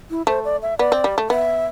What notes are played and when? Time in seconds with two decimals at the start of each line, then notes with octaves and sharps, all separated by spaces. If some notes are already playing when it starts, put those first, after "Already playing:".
0.10 E4
0.27 A3 C5
0.45 D5
0.62 E5
0.79 B3 D5
0.92 C4
1.04 G3
1.18 A3
1.30 B3 E5